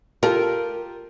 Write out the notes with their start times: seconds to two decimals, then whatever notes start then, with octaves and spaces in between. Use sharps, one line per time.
0.23 F4 G4 A4 A#4